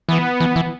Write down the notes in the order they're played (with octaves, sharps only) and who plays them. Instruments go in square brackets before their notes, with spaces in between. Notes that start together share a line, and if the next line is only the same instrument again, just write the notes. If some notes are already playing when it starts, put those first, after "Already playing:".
[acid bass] E3 [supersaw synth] B3
[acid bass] E3
E3